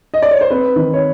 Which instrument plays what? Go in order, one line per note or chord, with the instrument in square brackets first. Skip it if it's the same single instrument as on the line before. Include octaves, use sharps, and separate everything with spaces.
[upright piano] D#5
D5
C#5
C5
C4 B4
D#3
C#5